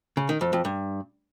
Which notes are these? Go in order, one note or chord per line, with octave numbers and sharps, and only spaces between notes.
C#3
D#3
F2
F2
G2